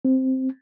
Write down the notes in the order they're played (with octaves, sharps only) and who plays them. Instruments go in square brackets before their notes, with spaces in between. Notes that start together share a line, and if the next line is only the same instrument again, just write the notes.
[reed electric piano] C4